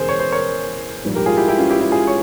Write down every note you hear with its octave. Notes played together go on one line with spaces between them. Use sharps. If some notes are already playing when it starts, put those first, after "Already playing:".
Already playing: E1 E2 C#3 G#4 A#4 C5
C#5
C5
A#4 C#5
A#1 G#2 G3
G4 A#4
F4 G#4
E4 G4
E4 G4
C#4 F4
E4 G4
E4 G4
F4 G#4
C#5